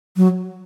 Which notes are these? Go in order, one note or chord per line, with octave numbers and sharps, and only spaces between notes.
F#3